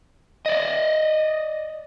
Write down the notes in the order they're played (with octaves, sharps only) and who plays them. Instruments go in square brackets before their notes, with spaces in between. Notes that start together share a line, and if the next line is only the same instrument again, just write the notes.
[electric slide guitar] D5 D#5